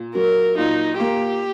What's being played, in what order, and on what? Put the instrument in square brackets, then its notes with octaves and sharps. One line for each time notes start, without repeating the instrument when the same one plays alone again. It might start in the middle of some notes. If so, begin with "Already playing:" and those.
Already playing: [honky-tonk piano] A#2
[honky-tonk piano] F#3 [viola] A#4
[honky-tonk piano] A#2 [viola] D#4
[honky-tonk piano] A#3 [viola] G4